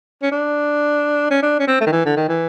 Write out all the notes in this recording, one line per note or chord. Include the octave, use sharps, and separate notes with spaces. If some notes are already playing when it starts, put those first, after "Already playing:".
C#4
D4
C#4
D4
C#4
C4
A3
D#3
E3
D3
D#3
E3